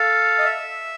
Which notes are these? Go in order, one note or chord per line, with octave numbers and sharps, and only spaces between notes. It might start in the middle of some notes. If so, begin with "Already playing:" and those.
Already playing: A4 F5
D#5
E5